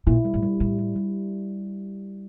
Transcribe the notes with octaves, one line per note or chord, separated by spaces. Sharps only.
A#2 E4
G3
A2
G3
A2 G3
G3
G3